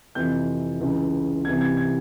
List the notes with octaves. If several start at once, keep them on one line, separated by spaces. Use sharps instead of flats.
F2 C3 E3 G6
C#2 C#3 E3
C2 C3 E3 G#6
G#6
G#6